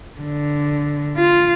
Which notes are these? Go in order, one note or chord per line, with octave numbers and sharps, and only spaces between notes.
D3
F4